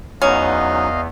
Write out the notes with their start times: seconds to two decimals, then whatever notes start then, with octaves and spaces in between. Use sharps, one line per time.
0.22 E2 F#3 B3 C#4 D#4 D#5 F5